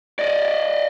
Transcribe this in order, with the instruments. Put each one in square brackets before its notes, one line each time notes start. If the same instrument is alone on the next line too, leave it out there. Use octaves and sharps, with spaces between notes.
[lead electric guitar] D5 D#5